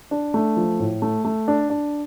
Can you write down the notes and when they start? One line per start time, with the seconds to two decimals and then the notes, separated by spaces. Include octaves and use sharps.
0.11 D4
0.34 A3
0.57 F3
0.79 A2
1.02 A3
1.25 A3
1.48 D4
1.70 D4